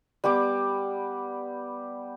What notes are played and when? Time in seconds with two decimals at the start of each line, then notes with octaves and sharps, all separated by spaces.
0.24 G3 B3 G4 D6